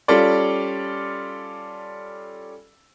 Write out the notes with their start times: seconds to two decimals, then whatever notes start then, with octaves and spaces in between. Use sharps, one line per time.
0.08 G3 C#4 F4 A4 D5